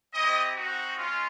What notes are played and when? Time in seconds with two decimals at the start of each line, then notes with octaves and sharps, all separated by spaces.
0.13 C4 E4 G4 D#5
0.56 C4 D#4 F#4
0.97 G#3 C#4 F4